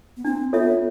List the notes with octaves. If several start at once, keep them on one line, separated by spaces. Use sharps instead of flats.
B3
C4 D4
B3 F4 A4 C#5 E5